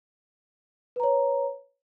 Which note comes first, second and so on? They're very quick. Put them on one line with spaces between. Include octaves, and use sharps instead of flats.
B4 A#5 C#5